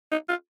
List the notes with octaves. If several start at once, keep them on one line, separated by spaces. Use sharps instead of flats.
D#4
F4